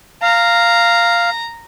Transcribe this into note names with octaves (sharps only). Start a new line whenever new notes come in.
F5 A#5